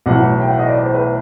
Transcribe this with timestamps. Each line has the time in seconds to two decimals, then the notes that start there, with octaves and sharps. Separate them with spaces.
0.06 B1 A2 E3 F#5
0.41 G5
0.50 F#5
0.59 D#5
0.68 D5
0.83 C5
0.94 B4